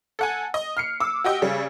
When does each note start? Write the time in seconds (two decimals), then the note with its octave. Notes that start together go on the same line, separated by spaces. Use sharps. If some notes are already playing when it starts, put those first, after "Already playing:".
0.19 A4 F#5 G#5
0.54 D#5
0.77 F6 C7 C#7
1.00 D6 E6
1.24 F#4 G4 D#5 G5
1.42 C#3 G3